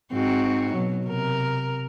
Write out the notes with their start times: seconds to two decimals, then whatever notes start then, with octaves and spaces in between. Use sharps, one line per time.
0.13 G#2 C4 F#4
0.73 B2 F#3
1.07 C3 A#4